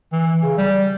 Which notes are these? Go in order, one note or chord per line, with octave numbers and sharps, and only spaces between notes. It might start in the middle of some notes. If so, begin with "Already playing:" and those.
E3
C#3
G3